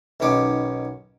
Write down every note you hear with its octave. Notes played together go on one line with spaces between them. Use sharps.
B1 B2 D#3 C#4 D6